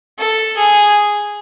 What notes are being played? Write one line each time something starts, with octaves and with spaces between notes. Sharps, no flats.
A4
G#4